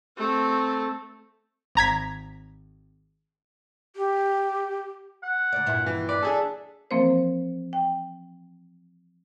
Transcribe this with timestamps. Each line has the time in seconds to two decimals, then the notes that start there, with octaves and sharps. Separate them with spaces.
0.17 A3 C4
1.75 G#1 A#5 G#6 B6
3.96 G4
5.23 F#5
5.52 D2 D5
5.66 G2 A#2 E4
5.86 E3
6.09 B4 D5
6.23 D4 G#4 A4 E5
6.91 E3 F3 A#3 C4 A#4 C5
7.73 G5